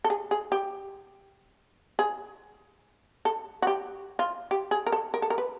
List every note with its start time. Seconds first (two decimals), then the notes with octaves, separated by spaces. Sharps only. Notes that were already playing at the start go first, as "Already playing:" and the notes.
0.04 A4
0.10 G#4
0.31 G#4
0.52 G4
1.99 G#4
3.25 A4
3.62 F#4
3.67 G4
4.19 F4
4.51 G4
4.71 G#4
4.86 A#4
4.92 A4
5.14 A#4
5.22 A4
5.30 A#4
5.38 B4